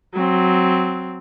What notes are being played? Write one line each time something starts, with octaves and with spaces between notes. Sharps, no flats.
F#3 C4